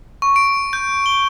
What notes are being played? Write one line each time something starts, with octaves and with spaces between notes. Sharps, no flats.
C#6
D7
G6
G7